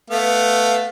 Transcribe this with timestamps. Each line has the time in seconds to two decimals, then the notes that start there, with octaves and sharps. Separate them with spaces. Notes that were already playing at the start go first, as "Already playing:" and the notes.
0.10 A3 B3 F5